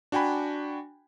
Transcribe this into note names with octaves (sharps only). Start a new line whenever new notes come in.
D4 F#4 G5 G#5 B5